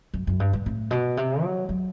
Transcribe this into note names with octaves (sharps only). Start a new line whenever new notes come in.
F#2
F#2
G2
G2
A2
B2
C3
F#3
F#3